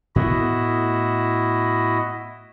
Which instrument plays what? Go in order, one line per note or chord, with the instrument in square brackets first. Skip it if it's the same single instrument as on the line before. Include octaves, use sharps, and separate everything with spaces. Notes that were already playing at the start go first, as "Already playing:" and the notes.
[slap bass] A2 B3 [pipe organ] E4 F#4 D#5